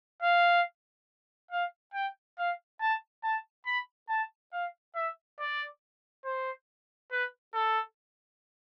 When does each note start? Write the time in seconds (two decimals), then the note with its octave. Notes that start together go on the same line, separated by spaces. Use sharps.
0.22 F5
1.51 F5
1.94 G5
2.38 F5
2.81 A5
3.24 A5
3.66 B5
4.09 A5
4.53 F5
4.95 E5
5.39 D5
6.25 C5
7.11 B4
7.54 A4